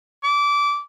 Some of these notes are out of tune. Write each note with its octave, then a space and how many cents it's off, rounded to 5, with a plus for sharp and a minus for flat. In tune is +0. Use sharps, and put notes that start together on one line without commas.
D6 -20